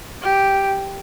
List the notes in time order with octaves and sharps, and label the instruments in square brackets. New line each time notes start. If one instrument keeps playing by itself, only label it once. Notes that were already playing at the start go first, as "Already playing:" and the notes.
[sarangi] G4